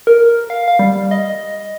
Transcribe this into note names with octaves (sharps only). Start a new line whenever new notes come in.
A#4
F5
F5
G3
D#5